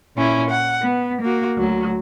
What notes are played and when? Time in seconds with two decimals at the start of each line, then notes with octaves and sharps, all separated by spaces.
0.17 A#2 C#4 E4
0.50 F#5
0.82 B3
1.21 A#3 F#4
1.56 D2 F#3